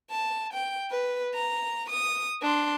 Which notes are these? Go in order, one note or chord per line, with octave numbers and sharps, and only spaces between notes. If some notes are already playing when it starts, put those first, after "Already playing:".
A5
G5
B4
A#5
D#6
D4 C6